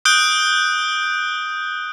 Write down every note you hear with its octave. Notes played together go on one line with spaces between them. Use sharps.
D#6 F#6 G6 D7 G7